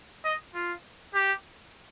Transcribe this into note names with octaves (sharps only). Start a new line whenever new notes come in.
D#5
F4
G4